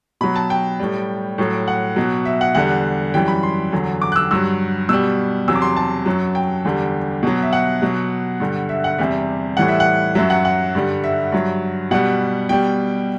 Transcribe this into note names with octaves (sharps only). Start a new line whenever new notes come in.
B2 F#3 B5
A5
G5
A2 G3
A2 F#3
F#5
B2 F#3
E5
F#5
E2 D3 G3 F#5
F#2 E3 G3 G5
B5
C6
E2 D3 F#3
D6
F#6
E6
G2 F#3 E6
B2 G3 E6
E2 C3 F#3 E6
D6
C6
A5
F#2 F#3
G5
E2 D3 G3
B2 F#3
E5
F#5
B2 F#3
G2 D3 G3
E5
F#5
E2 C3 G3 E5
A2 E3 G3 F#5
E5
F#5
F#2 F#3 E5
F#5
F#5
G2 D3 G3
E5
G2 F#3
B2 G3 F#5
B2 G3 G5